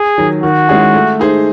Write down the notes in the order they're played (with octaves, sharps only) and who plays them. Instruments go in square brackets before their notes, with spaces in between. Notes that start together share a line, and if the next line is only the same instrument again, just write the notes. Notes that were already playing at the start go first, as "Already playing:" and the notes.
Already playing: [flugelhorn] G#4
[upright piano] D#3 F#3
[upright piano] D#3 [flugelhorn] F#4
[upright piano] G#3 C#4 E4 G#4
A3
D#4 G#4 C5